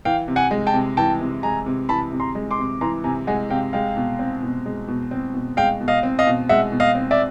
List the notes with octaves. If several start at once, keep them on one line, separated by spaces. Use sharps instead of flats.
E3 F5 G5
C3
F#5 G#5
G#3
G5 A5
C3
E3 G5 A5
C3
G#3 G#5 A#5
C3
E3 A5 B5
C3
A#5 C6
G#3
C6 D6
C3
E3 A#5 C6
C3 G#5 A#5
G#3 F#5 G#5
C3 F5 G5
G#3 F5 G5
B2
C4
B2
G#3
B2
C4
B2
G#3 F5 G5
B2
D#5 F5
C4
D#5 F5
B2
G#3 E5 F#5
B2
D#5 F5
C4
D5 E5